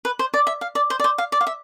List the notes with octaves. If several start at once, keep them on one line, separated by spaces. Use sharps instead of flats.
B4
C5
D5
E5
F5
D5
C5
D5
C5
F5
D5
F5
E5